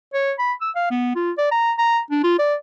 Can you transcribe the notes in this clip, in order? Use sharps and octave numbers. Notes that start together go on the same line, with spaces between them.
C#5
B5
E6
F5
B3
F4
D5
A#5
A#5
D4
F4
D5